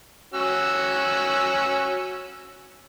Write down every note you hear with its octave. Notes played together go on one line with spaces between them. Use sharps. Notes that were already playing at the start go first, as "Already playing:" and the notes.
C#4 F#4 E6